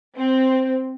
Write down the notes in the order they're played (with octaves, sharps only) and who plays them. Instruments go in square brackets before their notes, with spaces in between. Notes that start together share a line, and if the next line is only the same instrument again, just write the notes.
[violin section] C4